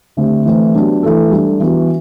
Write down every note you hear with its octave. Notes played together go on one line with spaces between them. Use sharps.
D3 A3 C4 G4
E3 A3 C4 E4
F#3 B3 D4 G4
E3 A3 E4 A4
G3 D4 A4
E3 B3 F#4